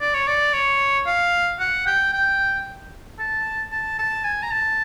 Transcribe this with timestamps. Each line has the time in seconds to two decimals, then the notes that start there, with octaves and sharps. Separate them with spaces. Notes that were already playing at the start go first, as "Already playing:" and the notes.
0.01 D5
0.14 C#5
0.27 D5
0.53 C#5
1.06 F5
1.59 F#5
1.86 G5
2.13 G5
3.19 A5
3.72 A5
3.99 A5
4.24 G#5
4.43 A#5
4.51 A5